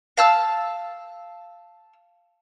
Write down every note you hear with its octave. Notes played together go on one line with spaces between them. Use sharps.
F5 A5 E6